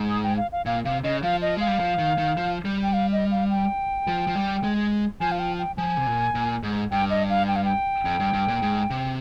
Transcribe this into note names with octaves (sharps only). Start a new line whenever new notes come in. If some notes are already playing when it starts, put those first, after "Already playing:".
Already playing: G#2
D#6
G5
F5
F5
A#2 F5
C3 F5
C#3 D#5
F3 F5
D#5
G#3 F5
G3
F3
D#3
D#3
F3
G3
G5
F5
D#5
F5
G5
F3
F3
G3
G#3
F3 G#5
F5
G5
G5
F3 G#5
C3
A#2
A#2
G#2
G2 G5
D#5
F5
G5
F5
G5
F2
G2
G2
A#2
G#2
C3